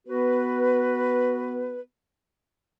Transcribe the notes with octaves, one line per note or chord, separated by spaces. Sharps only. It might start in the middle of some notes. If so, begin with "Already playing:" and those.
B3 F#4 B4